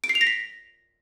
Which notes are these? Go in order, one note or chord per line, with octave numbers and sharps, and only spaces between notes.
D7
C7
F7
A#6
B6